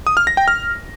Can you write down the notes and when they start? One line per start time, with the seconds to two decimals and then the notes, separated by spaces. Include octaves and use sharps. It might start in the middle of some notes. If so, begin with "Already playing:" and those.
0.07 D#6
0.17 F6
0.27 A#6
0.37 G5
0.48 F6